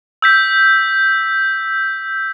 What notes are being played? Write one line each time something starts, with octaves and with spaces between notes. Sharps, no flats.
E6 G6 B6